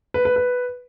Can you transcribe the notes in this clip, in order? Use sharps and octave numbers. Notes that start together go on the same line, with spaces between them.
B4
B4
B4